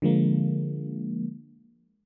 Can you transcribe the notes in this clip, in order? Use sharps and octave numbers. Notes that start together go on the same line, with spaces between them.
D3 F3 G#3 A#3